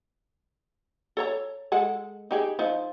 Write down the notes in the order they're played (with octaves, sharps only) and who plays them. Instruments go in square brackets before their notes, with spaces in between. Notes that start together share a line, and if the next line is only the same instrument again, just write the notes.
[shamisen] A4 C#5 A#5
G#3 A4 F#5
D#4 G4 G#4
F3 D#4